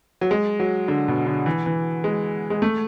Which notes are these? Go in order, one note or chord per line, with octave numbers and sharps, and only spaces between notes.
F#3
G#3
F#3
D3
B2
D3
E3
E3
G#3
G#3
A3